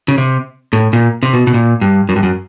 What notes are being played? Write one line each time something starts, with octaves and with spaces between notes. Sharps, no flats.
C#3
C3
A2
A#2
C3
B2
B2
A#2
G2
F#2
G2
F#2